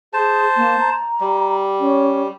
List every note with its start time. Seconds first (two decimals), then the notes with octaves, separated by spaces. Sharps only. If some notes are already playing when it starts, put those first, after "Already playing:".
0.13 G#4 C5 A5
0.57 A#3
0.80 A#5
1.21 G3
1.80 C#4